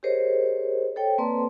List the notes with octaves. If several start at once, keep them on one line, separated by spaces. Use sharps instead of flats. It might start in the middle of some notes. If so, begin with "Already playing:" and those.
G4 G#4 A#4 C5 C#5 D#5
A4 C5 C#5 G5
A#3 C4 B4 D5 A5 C6